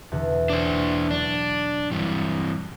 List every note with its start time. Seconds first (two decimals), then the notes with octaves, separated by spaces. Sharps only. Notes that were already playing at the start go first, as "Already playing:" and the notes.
0.12 E2 B2 D3
0.50 D4 C5
1.11 F#3 D4 D5
1.91 G2 E3